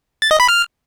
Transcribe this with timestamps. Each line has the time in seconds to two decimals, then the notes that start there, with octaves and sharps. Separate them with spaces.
0.22 A6
0.31 D#5
0.40 B5
0.48 F6